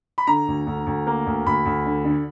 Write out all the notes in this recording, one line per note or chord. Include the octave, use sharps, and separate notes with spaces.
B5
D3 A#5
D2
D2
D2
A#3
D2
D2 B5
D2
D3
D3